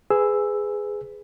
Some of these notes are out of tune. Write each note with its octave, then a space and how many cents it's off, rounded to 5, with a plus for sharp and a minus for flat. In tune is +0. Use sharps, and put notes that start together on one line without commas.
G#4 +0 B4 +20 E6 +0